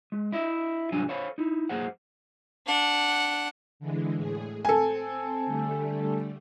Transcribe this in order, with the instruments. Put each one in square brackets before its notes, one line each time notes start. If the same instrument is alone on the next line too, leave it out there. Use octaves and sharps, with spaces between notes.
[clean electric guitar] G#3
E4 D#5 E5
C2 G#2 F#3 G3 D4 G#5
A4 C5 C#5 F5 B5
D#4 E4
F#2 A#3 G#4 C5 F#5
[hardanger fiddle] D4 F#5
[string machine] D3 E3 G#3
A2 G#4
[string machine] C4 [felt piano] A4 G#5
[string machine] D3 G3 A3